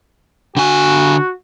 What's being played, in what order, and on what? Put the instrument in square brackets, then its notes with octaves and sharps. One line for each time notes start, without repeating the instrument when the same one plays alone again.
[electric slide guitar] D3 G#5 [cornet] F#4